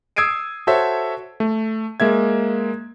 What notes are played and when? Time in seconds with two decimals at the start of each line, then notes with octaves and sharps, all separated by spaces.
0.16 D#6 E6 G#6 C7 D7 D#7
0.67 F#4 A4 C5 C#5 E5
1.40 A3
2.00 G#3 A#3 E5 G#6